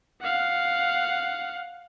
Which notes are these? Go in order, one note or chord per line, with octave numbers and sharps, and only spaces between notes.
F5 F#5